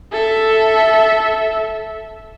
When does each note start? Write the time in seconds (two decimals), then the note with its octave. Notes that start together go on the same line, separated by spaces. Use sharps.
0.13 A4 E5